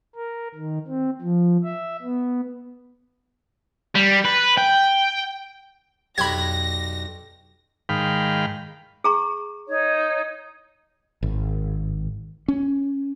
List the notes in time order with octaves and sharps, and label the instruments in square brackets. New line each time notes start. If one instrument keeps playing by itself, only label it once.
[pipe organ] A#4
D#3
C4
F3
E5
B3
[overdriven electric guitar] G3
B4
G5
[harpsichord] B1 D4 G4 [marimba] F2 [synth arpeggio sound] B5 G#6 [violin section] A#6
[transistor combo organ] G#2 D#3 F5 G5 B5
[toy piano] G#4 A#5 C#6
[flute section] D#4 C#5
[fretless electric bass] G#1
C#4